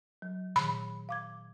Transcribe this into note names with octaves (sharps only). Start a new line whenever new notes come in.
F#3
A#2 D#3 B5
F5 D6 G#6